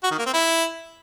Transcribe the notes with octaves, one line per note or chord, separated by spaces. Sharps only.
F#4
D#3
A#3
C4
E4